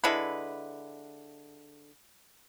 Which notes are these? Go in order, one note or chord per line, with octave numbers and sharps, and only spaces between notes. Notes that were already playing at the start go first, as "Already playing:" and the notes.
D3 G#3 E4 B4